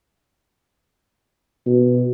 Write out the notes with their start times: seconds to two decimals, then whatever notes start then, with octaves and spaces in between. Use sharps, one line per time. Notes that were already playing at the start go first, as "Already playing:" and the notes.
1.66 B2